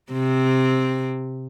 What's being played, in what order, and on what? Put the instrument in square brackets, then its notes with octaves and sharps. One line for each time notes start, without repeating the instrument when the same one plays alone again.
[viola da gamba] C3 C4